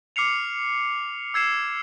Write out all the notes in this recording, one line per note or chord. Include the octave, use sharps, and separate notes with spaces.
D6 F6 C7 C#7 F7
E6 G#6 C7 E7